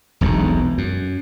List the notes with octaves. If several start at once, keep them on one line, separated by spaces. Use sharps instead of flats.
E1 B1 F2
F#2